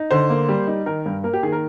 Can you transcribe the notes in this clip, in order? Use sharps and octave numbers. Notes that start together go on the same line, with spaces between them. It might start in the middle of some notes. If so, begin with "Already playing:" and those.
Already playing: D#4
D3 C5
A#3
G3
D#4
D#3 A#4
G2
A#3 A#4
G4
D#3 G#4
A#4